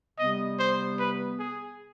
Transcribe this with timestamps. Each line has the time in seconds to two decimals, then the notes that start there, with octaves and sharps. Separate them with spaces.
0.18 C3 G3 B3 D#5
0.59 C5
0.99 B4
1.39 G#4